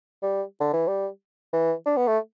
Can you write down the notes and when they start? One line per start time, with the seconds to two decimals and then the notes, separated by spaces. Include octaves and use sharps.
0.22 G3
0.60 D3
0.73 E3
0.88 G3
1.53 E3
1.86 D4
1.97 B3
2.07 A3